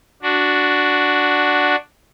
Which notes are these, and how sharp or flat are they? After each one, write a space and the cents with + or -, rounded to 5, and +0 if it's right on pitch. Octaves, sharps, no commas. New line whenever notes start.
D4 +0 F#4 +0